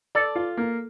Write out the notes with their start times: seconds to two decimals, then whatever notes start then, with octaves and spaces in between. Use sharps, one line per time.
0.15 A4 D5
0.36 F4
0.57 A#3